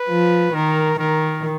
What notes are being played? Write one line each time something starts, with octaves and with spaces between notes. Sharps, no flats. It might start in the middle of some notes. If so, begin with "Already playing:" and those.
Already playing: B4
F3
D#3 A#4
D#3 A#4